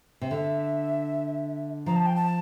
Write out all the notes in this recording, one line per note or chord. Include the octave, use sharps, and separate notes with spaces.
C3
D3 E5
F3 A#5
A5
G5
A5